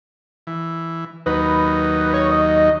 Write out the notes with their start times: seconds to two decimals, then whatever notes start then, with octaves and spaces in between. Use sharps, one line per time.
0.47 E3
1.26 D#2 F#3 D#4 B4
2.14 C#5
2.31 D#5